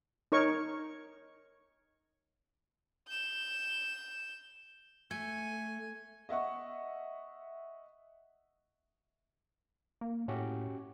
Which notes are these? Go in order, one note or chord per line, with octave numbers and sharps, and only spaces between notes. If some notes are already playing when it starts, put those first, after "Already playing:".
D#4 A#4 C#5 C#6
G6 E7
A3 G#5 G#6
D#5 E5 F#5 C#6
A#3
A2 C#4 F#4 G4